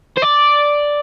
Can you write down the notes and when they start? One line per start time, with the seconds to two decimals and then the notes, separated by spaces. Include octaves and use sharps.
0.18 C5
0.23 D5